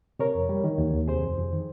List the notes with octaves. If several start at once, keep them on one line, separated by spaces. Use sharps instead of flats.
C3 A#4 C#5
F2
G3
D#3
D#2
D#2
C3 G#4 C5
F2
F2
D#3